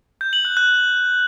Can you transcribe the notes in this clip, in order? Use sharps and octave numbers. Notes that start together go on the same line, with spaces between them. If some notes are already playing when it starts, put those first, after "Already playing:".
G6
F#7
F#6
F#6